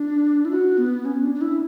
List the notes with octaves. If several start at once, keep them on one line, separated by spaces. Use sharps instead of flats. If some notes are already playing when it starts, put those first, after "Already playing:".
Already playing: D4
E4
F#4
B3
C#4
D4
D4
E4